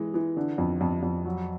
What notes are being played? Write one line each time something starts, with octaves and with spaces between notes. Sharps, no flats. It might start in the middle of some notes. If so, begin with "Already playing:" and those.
Already playing: E3 G#3
E3
D3
F2
F2
F2
F#3